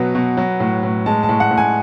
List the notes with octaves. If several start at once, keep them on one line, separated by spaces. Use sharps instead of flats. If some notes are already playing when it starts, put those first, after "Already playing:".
Already playing: B2 F#3 B4
B2
F#3
A2
A2
G#3 A5
A5
A2
F#5
A2
G#5